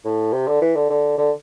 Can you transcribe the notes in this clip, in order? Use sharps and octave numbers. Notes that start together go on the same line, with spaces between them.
A2
C3
D3
E3
D3
D3
D3